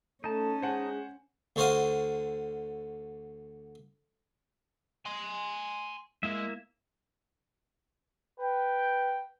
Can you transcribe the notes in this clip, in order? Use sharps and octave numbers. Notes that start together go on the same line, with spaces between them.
A3 C#4 D#4 A5
G#3 C5 F#5 G#5
D2 D3 F#4 C5 F5 D#6
G#5 C6
G#3 A#3 E4 E5
B4 G5